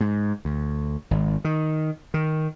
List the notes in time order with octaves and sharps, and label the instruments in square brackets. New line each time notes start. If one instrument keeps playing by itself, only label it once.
[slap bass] G#2
D2
G#1
D#3
D#3